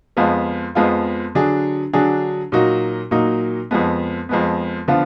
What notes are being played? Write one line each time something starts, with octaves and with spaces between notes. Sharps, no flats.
F2 F3 G#3 B3 F4
F2 F3 G#3 B3 F4
D3 F#3 D4 G#4
D3 F#3 D4 G#4
A#2 F#3 A#3 D#4 F#4
A#2 F#3 A#3 D#4 F#4
F2 F3 G#3 B3
F2 F3 G#3 B3
D3 F3 B3 F4